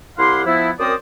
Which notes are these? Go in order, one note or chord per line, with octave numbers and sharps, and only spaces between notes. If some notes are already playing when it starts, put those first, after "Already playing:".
C2 E4 G4 F5 F#5 C6
F3 B3 E4
F#2 C4 A#4 C5 D5 D#6